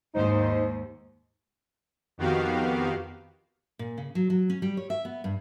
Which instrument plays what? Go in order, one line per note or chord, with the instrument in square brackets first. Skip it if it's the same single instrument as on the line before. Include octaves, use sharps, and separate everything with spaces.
[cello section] D#2 G#2 [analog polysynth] D#4 C5
[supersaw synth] F2 D#3 B3 F#4 G4 F5
[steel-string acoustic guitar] A#2
C#3
F#3
F#3
C#4
G3
C#5
E5
B3
G2